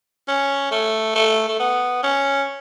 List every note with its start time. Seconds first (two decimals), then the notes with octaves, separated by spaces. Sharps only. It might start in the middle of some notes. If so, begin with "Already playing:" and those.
0.28 C#4
0.71 A3
1.15 A3
1.48 A3
1.59 B3
2.03 C#4